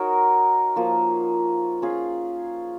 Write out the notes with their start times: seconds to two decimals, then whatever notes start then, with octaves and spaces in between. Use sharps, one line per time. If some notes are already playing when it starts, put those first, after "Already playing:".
Already playing: D#4 F#4 A#4 C#5
0.76 F3 A#3 F4
1.82 C#4 F4 G#4